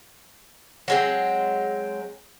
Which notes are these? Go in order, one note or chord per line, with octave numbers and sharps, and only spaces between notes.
F#3 G#3 C4